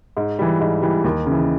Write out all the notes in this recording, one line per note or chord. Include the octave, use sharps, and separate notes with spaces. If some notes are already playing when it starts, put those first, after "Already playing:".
G#2
E3 G3
G#2
E3 G3
D#2
C#3 E3